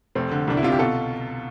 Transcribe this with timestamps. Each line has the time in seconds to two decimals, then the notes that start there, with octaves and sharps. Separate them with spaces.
0.15 F1 A3 C4
0.31 D3
0.48 C2 D4
0.57 E4
0.63 C3 F4
0.72 G4
0.79 B2 F4 A4